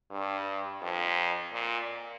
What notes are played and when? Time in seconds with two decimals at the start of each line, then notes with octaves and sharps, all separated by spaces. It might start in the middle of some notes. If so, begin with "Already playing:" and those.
0.11 G2
0.82 F2
1.53 A#2